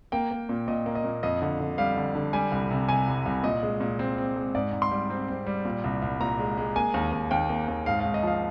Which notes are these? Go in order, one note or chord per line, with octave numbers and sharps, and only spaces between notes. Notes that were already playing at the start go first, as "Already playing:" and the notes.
A#3 G5
A#3
A#2
A#2 D#5
A#3
D#5
A#2
F2 D#5
D3
D3
G3 F5
D3
D3
G3 G#5
C2
C3
C3 G#5
C2
C2
A#2 D#5
G#3
A#2
C4
C4
G#3
G#2 D5
G#2
C6
G3
C4
C4
G3
A#2
C2
C2
A#2 A#5
G#3
G#3
A#3 G#5
D#2
D#2
D#2 G5
A#3
D#2
G#2 F5
F5
G#2
D#5
F3 F5